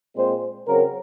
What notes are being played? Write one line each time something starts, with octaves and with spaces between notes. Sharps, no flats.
A#2 G#3 C4 C5
C#3 F#3 C4 A#4